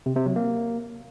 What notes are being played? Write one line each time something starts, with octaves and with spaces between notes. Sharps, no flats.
C3
C3
F#3
A#3